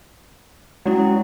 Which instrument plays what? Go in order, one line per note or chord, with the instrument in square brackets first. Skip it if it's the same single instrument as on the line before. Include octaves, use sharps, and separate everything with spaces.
[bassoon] F#3 [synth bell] G#3 C#4 E4